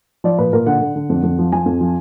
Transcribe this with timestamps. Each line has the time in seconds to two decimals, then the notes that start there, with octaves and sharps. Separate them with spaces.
0.24 F3 D5
0.39 A#2 B4
0.53 A#2 A#4
0.66 D3 F#5
0.81 D3
0.96 D3
1.10 F2
1.23 F2
1.39 F3
1.52 F3 G#5
1.66 F2
1.81 F3